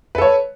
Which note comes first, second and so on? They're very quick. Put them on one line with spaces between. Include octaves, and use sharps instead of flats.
B4 A4 C#5